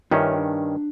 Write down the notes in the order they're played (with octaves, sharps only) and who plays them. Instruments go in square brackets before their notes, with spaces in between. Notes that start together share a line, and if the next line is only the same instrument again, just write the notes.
[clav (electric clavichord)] G2 D#3 C#4 [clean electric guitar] F4 C#5 E5
[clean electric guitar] D4